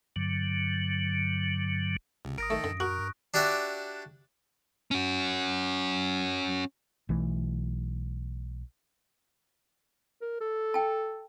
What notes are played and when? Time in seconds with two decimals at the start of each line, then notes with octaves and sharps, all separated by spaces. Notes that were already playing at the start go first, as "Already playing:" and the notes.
0.16 G2 D3 F#3
2.25 C#2 C3
2.38 G#1 A#4 D#6 A#6 D7
2.50 D#3 A3 A4
2.64 F#2 D3
2.80 F#4 A#4 C#6 F#6
2.99 G2
3.34 D4 F#4 G4 D5 E5
4.91 C#4 F#4
7.09 B1 E3 A3
10.21 A#4
10.40 A4
10.74 G5 A5